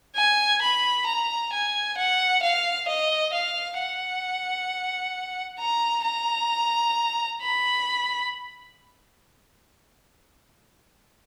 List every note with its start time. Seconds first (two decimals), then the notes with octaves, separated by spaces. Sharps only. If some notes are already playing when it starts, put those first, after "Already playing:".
0.16 G#5
0.62 B5
1.07 A#5
1.52 G#5
1.98 F#5
2.43 F5
2.88 D#5
3.33 F5
3.79 F#5
5.60 A#5
6.05 A#5
7.41 B5